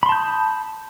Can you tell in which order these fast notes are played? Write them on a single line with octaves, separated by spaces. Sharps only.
B5 C6 A5 G6 D#6